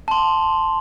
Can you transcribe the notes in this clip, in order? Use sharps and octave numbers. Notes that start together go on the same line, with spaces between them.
A5 C6